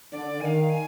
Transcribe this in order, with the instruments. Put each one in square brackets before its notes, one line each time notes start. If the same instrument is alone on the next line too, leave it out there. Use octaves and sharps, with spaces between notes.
[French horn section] D3 [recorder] D5
[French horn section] D#3 [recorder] F5 G#5
[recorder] G#5